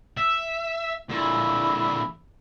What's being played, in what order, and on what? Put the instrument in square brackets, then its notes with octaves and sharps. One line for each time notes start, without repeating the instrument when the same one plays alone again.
[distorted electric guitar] E5
[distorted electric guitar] A#2 D3 [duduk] E4